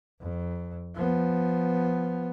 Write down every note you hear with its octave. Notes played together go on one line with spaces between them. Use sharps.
F2
F3 B3